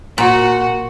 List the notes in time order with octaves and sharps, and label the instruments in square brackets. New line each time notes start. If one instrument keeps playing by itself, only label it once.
[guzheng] A#2 [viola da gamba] F#4